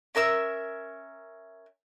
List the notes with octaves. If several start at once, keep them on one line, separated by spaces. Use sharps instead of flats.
C#4 A#4 E5 E6